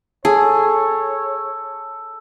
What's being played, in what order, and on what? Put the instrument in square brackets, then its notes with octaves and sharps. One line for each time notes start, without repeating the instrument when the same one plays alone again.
[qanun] G#4 [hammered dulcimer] A4 [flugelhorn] C#5